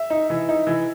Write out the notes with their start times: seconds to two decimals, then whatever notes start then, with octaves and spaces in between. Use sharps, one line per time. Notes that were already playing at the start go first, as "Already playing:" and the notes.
Already playing: E5
0.10 D#4
0.30 E3
0.49 D#4
0.67 E3